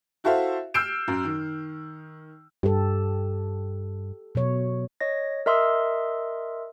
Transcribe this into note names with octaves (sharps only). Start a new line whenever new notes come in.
E4 F#4 A4 C5 E5 F5
E6 F6 G6 C7 D7 E7
F#2
D#3
G2 G4 A4
B2 F#3 C#5
C#5 D#5 A#6
A#4 D#5 E5 C6 D#6 E6